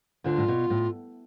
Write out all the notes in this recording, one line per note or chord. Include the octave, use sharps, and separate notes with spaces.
D2 D3 F4
A2
B2
A2